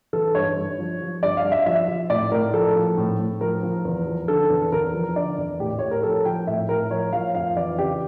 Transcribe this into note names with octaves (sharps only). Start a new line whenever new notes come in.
E3 A4
G2 C#5
G2
F3
F3
G2 D5
F5
G2
E5
F3 E5
F3
A2 D5
A2 A#4
F3 A4
F3
A2
A2
F3 A#4
F3
E2
F3
D3 A4
E2
E2 A#4
F3
D3 D5
E2
A2 G4
A2 C#5
A#4
F3 A4
F3 G5
A2 E5
A2 A#4
F3 C#5
F3 F5
F2 F5
E3 D5
C#3 G4